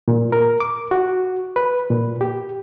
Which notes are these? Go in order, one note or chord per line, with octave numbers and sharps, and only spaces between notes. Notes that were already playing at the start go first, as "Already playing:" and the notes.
A#2
A#4
D6
F#4
B4
A#2
G4